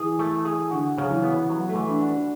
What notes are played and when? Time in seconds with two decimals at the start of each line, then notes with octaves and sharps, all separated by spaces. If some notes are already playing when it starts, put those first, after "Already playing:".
Already playing: E3 G#4
0.19 A3
0.45 G#4
0.71 D3 F#4
0.98 C#3 F#3
1.10 E3
1.23 B3
1.49 F#3 F#4
1.69 A3
1.75 E3
1.88 D4
2.01 F#4
2.08 D4